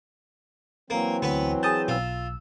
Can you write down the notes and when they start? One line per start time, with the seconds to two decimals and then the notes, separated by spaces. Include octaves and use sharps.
0.90 E3 F#3 A#3 C4
1.22 D2 B3 B4
1.63 G#4 A5 D#6 G6
1.88 B1 F4 E6